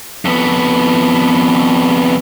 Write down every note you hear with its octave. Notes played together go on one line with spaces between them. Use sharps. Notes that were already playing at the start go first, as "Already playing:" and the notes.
F2 B3